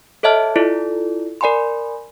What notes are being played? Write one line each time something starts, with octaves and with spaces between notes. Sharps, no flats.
A4 C#5 D#5 E5 A5 F6
E4 F4 A4 D5
A#4 D5 G#5 B5 C6